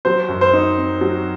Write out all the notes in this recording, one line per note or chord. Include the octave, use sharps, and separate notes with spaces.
F#3 C5
F#2
C5
D#4
C4
F#3